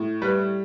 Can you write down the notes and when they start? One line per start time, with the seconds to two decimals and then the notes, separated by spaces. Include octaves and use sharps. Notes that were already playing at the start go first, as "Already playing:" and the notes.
Already playing: A2
0.22 G3 B4